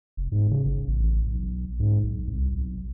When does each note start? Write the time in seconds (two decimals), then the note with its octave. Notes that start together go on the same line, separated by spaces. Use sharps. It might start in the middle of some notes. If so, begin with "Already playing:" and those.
0.17 F1
0.32 G#2
0.51 C#3
0.65 G1
0.88 A1
1.27 B1
1.80 G#2
2.04 B1
2.27 C2
2.54 B1